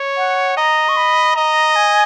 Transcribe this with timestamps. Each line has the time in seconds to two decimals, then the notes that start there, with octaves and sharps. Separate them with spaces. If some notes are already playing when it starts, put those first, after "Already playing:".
Already playing: C#5
0.17 F#5
0.57 D#5 A#5
0.89 C#6
0.97 B5
1.35 D#5 A#5
1.76 G#5